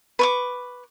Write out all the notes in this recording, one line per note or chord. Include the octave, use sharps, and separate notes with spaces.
B4 C#6 D6